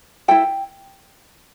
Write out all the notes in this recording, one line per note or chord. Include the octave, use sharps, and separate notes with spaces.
E4 A4 G5